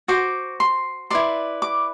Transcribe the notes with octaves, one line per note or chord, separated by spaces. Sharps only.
F#4 C5 D6
C6
E4 B4 D5 C6
D6